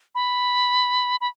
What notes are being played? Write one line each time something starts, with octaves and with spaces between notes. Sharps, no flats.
B5
B5